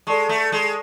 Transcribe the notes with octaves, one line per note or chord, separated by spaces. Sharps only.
G#3 A4 D5 A5 C#6
A3
G#3